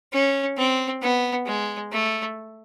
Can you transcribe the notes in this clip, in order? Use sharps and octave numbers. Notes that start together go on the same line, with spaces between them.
C#4
C4
B3
G#3
A3